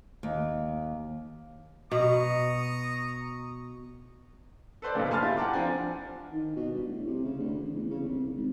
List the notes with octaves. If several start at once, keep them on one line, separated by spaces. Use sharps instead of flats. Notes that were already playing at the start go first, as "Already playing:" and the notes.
D#2
B2 A#5 C#6 D#6
A4 B4 C5 D5
B1 G2 A#2 C#3
G#5 A5 B5 C6 F6 A6
E4 F4 G4
F#5 G5 A5 A#5 D6
F3 C4 D4 G#5
D#3
B2
G2
A2
C3
C#3
D2
A1
E2
C#3
C2
G#1